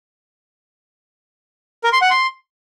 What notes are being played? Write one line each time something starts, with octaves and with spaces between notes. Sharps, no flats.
A#4
C6
F#5
C6